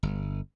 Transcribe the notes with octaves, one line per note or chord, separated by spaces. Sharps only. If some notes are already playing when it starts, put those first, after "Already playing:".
G1